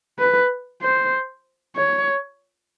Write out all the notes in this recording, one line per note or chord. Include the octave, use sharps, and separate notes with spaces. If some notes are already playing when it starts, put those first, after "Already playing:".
B4
C5
C#5